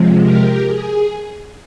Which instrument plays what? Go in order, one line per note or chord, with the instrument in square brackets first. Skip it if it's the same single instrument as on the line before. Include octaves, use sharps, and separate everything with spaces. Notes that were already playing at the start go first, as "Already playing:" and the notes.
Already playing: [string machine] C3 F3 G#3
G4 A#4
G#4